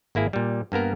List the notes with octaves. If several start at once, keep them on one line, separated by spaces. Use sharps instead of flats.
G#1 A#3 E4 G#4
A#2 G3
G2 A#3 B3 A#4